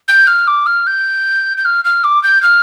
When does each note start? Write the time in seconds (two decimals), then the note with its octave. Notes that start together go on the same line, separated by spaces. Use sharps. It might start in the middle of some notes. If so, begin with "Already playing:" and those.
0.08 G6
0.27 F6
0.47 D6
0.66 F6
0.87 G6
1.57 G6
1.65 F6
1.84 F6
2.04 D6
2.23 G6
2.42 F6